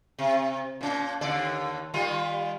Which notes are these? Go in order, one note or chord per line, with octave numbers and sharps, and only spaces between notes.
C3
A#2 C#4
D#2 D3 D5
D#3 G3 F4